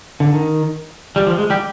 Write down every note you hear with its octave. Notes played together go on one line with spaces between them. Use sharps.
D3
D#3
G3
F3
G#3
G3 G4